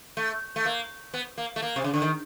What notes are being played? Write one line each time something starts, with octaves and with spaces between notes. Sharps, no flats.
A3
A3
A#3
B3
A#3
A3
A#3
C3
C#3
D3
D#3